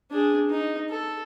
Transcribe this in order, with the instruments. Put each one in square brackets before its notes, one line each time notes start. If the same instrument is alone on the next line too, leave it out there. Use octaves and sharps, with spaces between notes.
[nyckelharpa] D4 G#4
D#4
A4